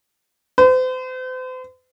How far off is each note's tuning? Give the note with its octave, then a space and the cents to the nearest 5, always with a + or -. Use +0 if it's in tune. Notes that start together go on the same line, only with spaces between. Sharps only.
C5 -40